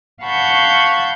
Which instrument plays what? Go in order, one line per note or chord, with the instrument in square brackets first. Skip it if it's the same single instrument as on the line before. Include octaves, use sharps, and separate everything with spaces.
[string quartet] F5 F#5 A5 B5 C#6 G6